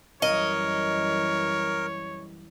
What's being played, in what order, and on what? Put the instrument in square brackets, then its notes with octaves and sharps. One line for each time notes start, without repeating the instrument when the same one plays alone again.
[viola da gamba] F#2 E3 G3 [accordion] A#4 [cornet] C#5 [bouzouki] D#5